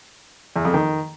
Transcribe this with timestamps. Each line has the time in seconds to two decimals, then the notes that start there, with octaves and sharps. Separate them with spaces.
0.56 E2
0.65 F2
0.74 D#3